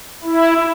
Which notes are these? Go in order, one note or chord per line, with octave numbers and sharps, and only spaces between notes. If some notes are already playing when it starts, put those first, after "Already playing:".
E4